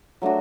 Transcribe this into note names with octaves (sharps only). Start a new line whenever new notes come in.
F#3 A3 D4 F#4